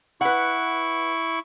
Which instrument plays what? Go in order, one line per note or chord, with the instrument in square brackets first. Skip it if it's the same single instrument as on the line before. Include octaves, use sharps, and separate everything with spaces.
[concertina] E4 C#6 [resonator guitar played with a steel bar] B4 F#5